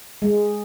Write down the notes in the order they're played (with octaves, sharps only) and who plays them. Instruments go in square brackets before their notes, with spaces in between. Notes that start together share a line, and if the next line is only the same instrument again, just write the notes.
[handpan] G#3